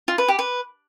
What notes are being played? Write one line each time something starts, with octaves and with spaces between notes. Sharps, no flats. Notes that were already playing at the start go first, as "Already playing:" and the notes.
F4
B4
G4
B4